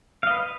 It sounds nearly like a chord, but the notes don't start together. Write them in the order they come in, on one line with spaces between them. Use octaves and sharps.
F5 D#5 B4